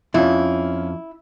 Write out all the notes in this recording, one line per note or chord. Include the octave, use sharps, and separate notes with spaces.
F2 C#4 E4 F4